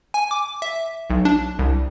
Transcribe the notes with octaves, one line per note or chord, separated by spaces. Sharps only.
G#5
D6
E5
B1
D4
C2